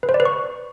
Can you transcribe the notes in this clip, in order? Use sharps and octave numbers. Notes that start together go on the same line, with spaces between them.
B4
C5
D5
B4
C#6